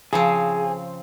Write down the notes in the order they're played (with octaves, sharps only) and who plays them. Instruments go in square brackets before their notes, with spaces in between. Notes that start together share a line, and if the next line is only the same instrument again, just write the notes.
[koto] C#3 F3 C4 [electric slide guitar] G#4